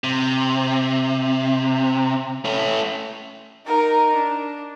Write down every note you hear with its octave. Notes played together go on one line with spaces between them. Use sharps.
C3
A3 C#4
D#4 A#4
D4